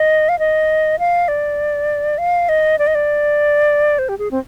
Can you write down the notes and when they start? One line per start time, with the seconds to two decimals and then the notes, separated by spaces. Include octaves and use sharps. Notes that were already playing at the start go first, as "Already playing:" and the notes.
Already playing: D#5
0.29 F5
0.39 D#5
0.99 F5
1.28 D5
2.18 F5
2.49 D#5
2.79 D5
2.87 D#5
2.95 D5
3.99 C5
4.09 G4
4.19 G#4
4.31 C4